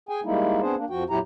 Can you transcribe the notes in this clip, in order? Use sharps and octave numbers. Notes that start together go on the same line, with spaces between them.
G#4 G5 G#5
G3 G#3 A#3 D#4 E4
B3 C4 D4 G#4 C5
A#3 D4
F2 F3 F#4 G5
F2 A#2 F#3 E4 G4 A#5